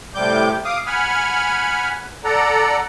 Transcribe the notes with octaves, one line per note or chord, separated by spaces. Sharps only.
A2 C3 G3 D6 G6
F5 D6 D#6
F#5 G#5 B5 F6
A4 D5 F#5 A#5